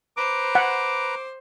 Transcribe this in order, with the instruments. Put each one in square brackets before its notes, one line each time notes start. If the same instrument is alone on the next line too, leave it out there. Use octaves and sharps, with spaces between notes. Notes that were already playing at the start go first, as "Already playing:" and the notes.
[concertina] B4 A#5 [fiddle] C5 [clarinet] D6
[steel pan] F#5